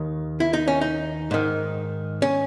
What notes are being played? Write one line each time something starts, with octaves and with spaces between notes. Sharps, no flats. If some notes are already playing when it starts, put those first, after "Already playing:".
Already playing: D#2 D#3
E4
D#4
C#4
D#4
G#2 D#3
C#4